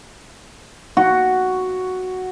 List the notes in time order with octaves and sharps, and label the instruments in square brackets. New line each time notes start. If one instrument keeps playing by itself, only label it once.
[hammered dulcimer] F#4